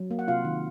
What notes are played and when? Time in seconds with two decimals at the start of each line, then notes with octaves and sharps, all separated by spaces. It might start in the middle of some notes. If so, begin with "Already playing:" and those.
Already playing: F#3
0.11 A#3
0.19 F#5
0.28 C3 F4 F5
0.45 D#3